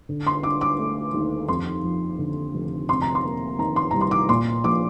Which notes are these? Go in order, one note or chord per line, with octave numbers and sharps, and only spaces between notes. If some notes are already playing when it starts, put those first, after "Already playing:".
D3
C6
D4 D6
D6
A3
D#2
F2 C6
F3
D3
F1
C3 C6
A#5
C6
A#3
D#3 A#5
C6
C2 A#5
C6
D6
A#2 C6
A#1 D6